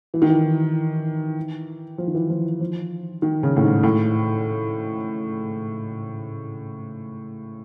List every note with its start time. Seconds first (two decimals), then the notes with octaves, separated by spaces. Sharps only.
0.14 E3
0.22 D#3
0.29 E3
1.98 F3
2.07 D#3
2.14 E3
2.30 F3
2.60 F3
3.22 D#3
3.43 C#3
3.57 A2
3.63 G#2
3.83 A2